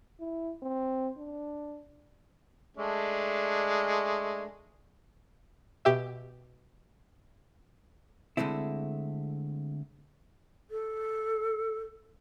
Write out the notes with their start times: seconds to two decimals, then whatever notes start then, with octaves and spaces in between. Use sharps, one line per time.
0.20 E4
0.63 C4
1.18 D4
2.77 G#3 A3 D4
5.85 B2 G4 E5
8.37 D3 G#3 A3 C4 E4
10.71 A4